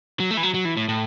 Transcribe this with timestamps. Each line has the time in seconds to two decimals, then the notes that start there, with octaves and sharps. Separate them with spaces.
0.20 F#3
0.31 A3
0.37 E3
0.43 F#3
0.54 F#3
0.65 E3
0.77 A2
0.89 A2